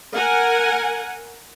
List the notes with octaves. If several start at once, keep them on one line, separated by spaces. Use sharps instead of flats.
A#4 F#5 G#5